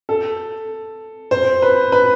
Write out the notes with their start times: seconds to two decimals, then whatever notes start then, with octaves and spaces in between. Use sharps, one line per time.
0.09 A4
1.31 C5
1.62 B4
1.92 B4